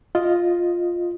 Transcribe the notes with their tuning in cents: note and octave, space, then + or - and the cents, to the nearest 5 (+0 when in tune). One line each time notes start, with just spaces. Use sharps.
F4 +0 D#5 +0